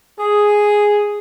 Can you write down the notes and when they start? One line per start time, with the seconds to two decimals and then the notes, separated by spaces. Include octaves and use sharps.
0.20 G#4